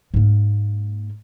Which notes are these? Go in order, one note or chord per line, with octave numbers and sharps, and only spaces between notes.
G#2 A#3